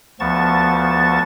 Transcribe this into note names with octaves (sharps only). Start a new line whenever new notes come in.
D2 F3 B3 A5 C#6 A6